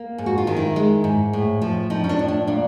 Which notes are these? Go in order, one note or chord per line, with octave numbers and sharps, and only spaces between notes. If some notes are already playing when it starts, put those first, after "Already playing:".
Already playing: A#3
G#2
F#4
F4
D#3
E4
G#3
G#2
A2
F3
F3 D#4
C#4
D4
A2
D4
A#2 D4